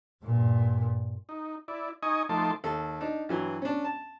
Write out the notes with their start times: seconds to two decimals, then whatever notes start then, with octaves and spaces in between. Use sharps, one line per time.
0.24 G2 A#2
1.29 D#4
1.68 E4 D5
2.03 D#4 D#5 G#5 C#6 D#6
2.29 F3 A3 D#4 A5 C6 D6
2.64 D#2 A4
3.01 D4 D#4
3.29 G2 E3 F#3
3.62 C#4 D4
3.85 A5